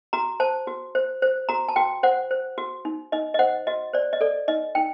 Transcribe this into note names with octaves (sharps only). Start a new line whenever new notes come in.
F#4 A#5
C5 A5
F#4
C5
C5
F#4 A#5
A5
F#4 G5
C5 F#5
C5
F#4
D#4
D#4 D#5
D#5
C5 F#5
F#4 D#5
C5 D5
D#5
A4 D5
D#4 D#5
D#4 G5